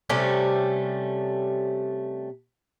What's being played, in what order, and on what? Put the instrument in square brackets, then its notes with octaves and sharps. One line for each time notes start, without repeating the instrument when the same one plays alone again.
[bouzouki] C3 G3 A3 C#4